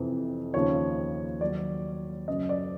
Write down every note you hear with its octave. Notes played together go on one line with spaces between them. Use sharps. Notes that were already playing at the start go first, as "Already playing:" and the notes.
Already playing: F2 C3 E3
D#2 C#3 F3 C#5
D#2 D#3 F#3 D5
F#2 C#3 F#3 D#5
D5